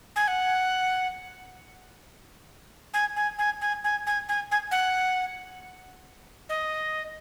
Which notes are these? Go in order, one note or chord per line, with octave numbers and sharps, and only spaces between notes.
G#5
F#5
G#5
G#5
G#5
G#5
G#5
G#5
G#5
G#5
F#5
D#5